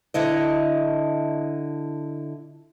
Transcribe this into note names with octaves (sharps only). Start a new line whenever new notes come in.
D3 E4 D#5